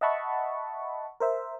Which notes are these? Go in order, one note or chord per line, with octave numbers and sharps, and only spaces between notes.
D#5 E5 F#5 A5 B5 C#6
A#4 C5 E5